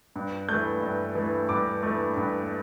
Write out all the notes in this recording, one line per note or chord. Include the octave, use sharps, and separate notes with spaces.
G2
E3 A3 G6
G2
E3 A3
G2 D6
E3 A3
G2